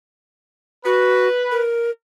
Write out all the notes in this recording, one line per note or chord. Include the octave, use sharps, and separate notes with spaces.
F#4 B4
A#4